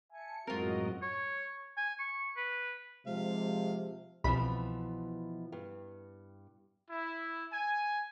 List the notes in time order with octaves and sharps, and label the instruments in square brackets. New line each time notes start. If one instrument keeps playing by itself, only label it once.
[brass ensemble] E5 G#5 A5 [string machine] C#7
[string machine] F#2 A2 D#5 [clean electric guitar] G#3 C4 [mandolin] F4 A#4 [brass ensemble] F#4
[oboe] C#5
G#5
C#6
B4
[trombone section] C3 [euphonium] F3 [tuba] G#3 [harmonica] F5
[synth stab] C2 B5 [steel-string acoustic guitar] B2 E3 F3
[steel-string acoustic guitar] G2
[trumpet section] E4
G#5